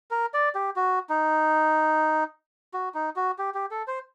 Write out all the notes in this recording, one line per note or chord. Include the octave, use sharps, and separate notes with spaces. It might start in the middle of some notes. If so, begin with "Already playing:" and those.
A#4
D5
G4
F#4
D#4
F#4
D#4
F#4
G4
G4
A4
C5